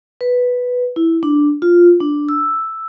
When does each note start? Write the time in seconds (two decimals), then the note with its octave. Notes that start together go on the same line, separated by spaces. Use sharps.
0.21 B4
0.96 E4
1.23 D4
1.62 F4
2.00 D4
2.29 E6